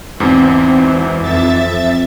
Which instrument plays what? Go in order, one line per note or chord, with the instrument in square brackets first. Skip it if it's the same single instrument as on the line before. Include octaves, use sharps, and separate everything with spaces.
[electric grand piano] E2 G#2 B2 [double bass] E3 [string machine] C4
[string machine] F2 E5 A6